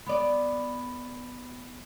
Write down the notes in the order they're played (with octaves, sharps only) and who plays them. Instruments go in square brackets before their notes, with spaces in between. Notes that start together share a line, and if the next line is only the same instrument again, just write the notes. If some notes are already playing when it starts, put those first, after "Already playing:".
[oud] B3 D5